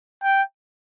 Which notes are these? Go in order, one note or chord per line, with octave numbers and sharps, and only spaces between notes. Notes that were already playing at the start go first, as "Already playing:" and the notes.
G5